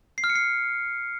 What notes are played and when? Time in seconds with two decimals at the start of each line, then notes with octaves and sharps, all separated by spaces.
0.18 C7
0.24 F6
0.30 C#7
0.35 C7